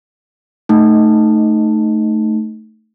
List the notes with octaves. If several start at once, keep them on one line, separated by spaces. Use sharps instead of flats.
A3 D#4